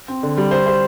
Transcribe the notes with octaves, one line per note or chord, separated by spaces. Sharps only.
C4
D3
G3
C5
C5